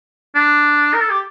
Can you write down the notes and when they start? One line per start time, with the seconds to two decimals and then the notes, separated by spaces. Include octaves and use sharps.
0.35 D4
0.94 A#4
1.01 A4
1.10 G4